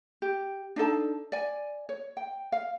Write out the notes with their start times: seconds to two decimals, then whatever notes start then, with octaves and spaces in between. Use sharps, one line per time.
0.22 G4
0.76 D4 D#4 A4 A5
1.32 D5 G#5
1.89 C#5
2.17 G5
2.52 F5